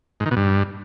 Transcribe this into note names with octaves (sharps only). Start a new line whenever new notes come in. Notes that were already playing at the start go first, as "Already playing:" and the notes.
G#2
D#3
B2
G2